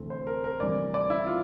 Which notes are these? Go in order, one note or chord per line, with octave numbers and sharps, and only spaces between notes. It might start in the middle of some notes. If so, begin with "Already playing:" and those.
Already playing: D2 C3 E3 A3 C4
C5
A#4
A#4
D2 C3 E3 G3 D5
D5
E4
F4